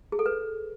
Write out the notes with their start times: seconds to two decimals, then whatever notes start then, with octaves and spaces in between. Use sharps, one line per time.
0.12 G#4
0.19 A4
0.26 B4